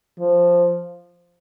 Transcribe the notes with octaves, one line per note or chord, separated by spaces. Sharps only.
F3